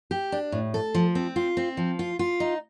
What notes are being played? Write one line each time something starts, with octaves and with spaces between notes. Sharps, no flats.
G4
D4
A2
A4
F3
C4
F4
C4
F3
F4
F4
D#4